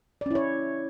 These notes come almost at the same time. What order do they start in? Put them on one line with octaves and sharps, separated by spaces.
D5 C#4 E4 C#5